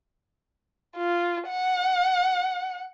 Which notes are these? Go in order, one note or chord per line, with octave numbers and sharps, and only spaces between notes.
F4
F#5